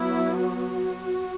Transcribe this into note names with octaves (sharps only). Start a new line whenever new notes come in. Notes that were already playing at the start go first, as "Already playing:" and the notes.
Already playing: F#3 B3 E4
F#4